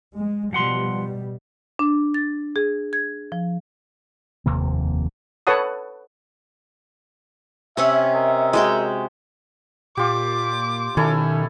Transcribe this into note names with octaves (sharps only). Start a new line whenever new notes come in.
G#3
B2 F3 G3 F#5 C6
D4
A6
G#4
G#6
F3
F1 D#2 C3 A#3
A4 B4 C#5 F#5 A5 D#6
C3 C#4 E5 F#5
A#4 D#5 E5
G#3 F#4 G5
A#2 F4 G4 D6
B2 D#3 C#4 E4 A4